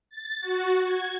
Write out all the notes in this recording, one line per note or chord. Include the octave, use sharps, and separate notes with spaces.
A6
F#4
G#6